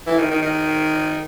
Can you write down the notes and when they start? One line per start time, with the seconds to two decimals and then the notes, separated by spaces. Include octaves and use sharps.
0.07 E3
0.18 D#3
0.30 D#3
0.42 D#3